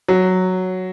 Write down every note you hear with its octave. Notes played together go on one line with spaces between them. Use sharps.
F#3